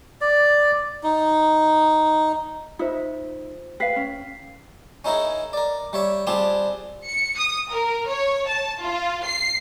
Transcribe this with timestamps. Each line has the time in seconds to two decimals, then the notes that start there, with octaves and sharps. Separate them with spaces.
0.21 D5
1.03 D#4
2.79 D#4 F4 C5 E5
3.80 B4 F5 G5 B6 C7
3.96 C#4
5.05 C#4 D#4 E4 G#4 A#4
5.53 A#4 D5
5.93 G3 C#5 E5
6.27 G3 C4 D4 F4 G4 G#4
7.05 C#7
7.38 D#6
7.70 A#4
8.07 C#5
8.47 A5
8.81 F4
9.23 C7